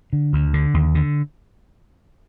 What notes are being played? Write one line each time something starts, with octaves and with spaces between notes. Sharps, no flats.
D3
D2
D3
D#2
D3